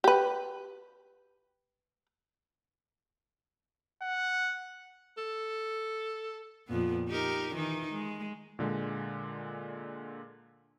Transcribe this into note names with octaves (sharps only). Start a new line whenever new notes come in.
G4 B4
F#5
A4
F2 A#2 B3
D#4 G4 A#4
D#3 E3 D#4
G#3
A#2 D3 G#3